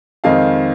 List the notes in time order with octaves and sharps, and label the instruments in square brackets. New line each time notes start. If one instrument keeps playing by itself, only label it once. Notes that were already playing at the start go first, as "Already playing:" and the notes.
[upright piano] F2 D#3 G#3 C4 F5